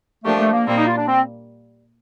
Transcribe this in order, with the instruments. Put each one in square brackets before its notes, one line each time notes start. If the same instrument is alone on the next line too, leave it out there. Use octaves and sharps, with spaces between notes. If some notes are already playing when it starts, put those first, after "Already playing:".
[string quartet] F3 A#3 D4 G4 [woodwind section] A3
[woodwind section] A3
A#3
[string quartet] A#2 G3 A#3 [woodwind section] C4
[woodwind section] D#4
F4
D4
C4